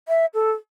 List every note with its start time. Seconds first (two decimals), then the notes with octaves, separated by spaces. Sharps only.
0.08 E5
0.34 A4